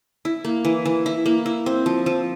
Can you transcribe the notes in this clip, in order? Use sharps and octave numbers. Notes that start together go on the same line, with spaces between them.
E4
A#3
E3
E3
E4
A#3
E4
C4
F3
F3